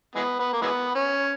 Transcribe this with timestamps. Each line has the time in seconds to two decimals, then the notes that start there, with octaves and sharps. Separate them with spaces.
0.15 E3 G#3 B3
0.39 B3
0.53 A#3
0.62 E3 G#3 B3
0.95 C#4